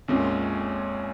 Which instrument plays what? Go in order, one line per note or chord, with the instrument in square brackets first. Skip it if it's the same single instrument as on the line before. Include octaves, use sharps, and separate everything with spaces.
[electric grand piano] A#1 A#2 G#3 C#4 [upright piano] F2